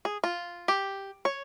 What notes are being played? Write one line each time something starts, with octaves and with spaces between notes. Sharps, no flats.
G#4
F4
G4
C#5